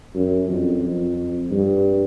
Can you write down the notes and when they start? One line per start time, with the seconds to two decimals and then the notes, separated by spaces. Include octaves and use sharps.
0.15 F#2
0.49 F2
0.83 F2
1.51 G2